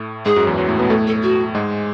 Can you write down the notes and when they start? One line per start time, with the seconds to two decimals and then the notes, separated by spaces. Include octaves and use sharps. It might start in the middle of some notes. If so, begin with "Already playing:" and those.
Already playing: A2 A3
0.25 G#2 G#3 G#4
0.36 F#2 F#3
0.47 E2 E3
0.58 F#2 F#3
0.69 A2 A3
0.79 B2 B3
0.90 A2 A3 A4
1.07 A4
1.23 F#4
1.55 G#2 G#3